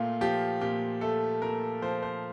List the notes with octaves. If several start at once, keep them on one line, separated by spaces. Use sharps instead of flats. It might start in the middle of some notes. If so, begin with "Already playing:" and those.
Already playing: A#2 A3 F4
F3 G4
A#2 G4
A3 A4
A#2 A#4
F3 C5
C5